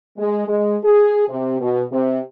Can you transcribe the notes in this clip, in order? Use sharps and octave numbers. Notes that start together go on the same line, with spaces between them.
G#3
G#3
G#4
C3
B2
C3